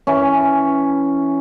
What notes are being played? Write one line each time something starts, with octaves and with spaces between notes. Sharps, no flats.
E3 C#4